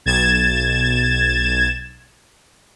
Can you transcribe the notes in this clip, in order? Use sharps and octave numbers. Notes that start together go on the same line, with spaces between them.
B1 G#6 A6 E7